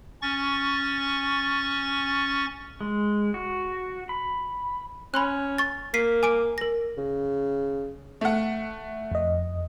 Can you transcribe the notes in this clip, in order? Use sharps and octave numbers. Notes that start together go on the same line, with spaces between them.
C#4 C#6 A6
G#3
F#4
B5
C#4 B5 C6 F#6
C#6 A6
A#3 B6 C7 D#7
G#5 D6 D7
A#4 A#6
C#3
A3 F#5
F2 D#5